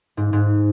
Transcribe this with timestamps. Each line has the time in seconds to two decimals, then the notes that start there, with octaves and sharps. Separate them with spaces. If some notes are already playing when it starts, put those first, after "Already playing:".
0.17 G#2
0.33 G#2